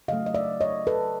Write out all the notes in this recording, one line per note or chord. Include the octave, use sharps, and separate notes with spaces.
C#3 F#3 A3 D#5 F5
D#5
D5 E5
C#5 D#5
A4 B4